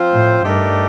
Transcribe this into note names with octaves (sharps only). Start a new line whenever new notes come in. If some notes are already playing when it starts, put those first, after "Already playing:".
Already playing: F3 C4 F4 C5
A2
G2 A3 D#4 G4 A#4 D5